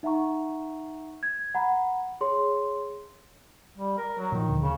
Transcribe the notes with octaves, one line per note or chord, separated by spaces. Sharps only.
D#4 E5 F#5 A#5 C#6
G#6
F#5 A#5 B5
G#4 C#5 C6
G3
A#4
F#3
A#2 D#3 F3
D2
C#3